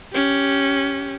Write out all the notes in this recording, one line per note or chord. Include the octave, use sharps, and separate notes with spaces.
C#4 G4